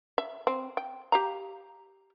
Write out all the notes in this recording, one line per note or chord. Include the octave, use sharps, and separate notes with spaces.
E5
C4
G5
G4 F5 A#5